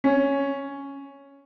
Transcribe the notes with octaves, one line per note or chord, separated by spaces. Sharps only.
C#4